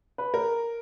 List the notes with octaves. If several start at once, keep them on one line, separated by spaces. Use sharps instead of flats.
B4
A#4